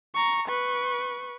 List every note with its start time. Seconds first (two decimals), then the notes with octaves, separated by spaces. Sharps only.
0.15 A#5 C#6
0.48 B4 C#6